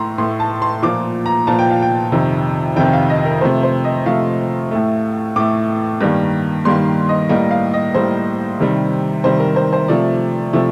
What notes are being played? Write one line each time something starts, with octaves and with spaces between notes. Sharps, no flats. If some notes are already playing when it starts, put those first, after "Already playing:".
Already playing: A2 A3 A#5 C6
A2 A3 C6
A5
C6
A#2 F3 A#3 D6
A#5
A#2 F3 A#3 A5
G5
F5
G5
F2 C3 D#3
F2 C3 D#3 G5
F5
D#5
A#4
C3 F3 A3 C5
C5
D#5
C3 F3 A3 F5
A2 A3
A2 A3 D6
G2 D#3 G3 A#3
G2 D#3 G3 A#3 C6
D#5
A2 G3 A#3 D#5
F5
D#5
A2 G3 A#3 C5
C3 D#3 G3
C3 D#3 G3 C5
A#4
C5
C5
C3 F3 A3 D5
C3 F3 A3